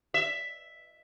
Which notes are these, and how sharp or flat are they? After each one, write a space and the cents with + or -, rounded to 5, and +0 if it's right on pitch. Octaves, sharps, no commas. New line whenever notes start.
E5 +5